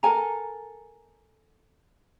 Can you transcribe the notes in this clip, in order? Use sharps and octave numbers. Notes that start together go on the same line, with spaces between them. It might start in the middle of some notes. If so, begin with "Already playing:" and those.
A4 A#4 G#5 A#5